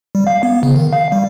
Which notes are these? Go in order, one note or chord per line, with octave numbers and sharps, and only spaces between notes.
G3
F5
B3
C#3
D#3
F5
G3